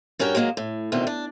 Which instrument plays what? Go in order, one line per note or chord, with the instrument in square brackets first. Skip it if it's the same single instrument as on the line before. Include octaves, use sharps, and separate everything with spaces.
[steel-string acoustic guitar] G2 C#4 F#4 A#4 G5
F#3 G#3 A#3 C4 D#4
A2
D2 B2 D#3 C4
D4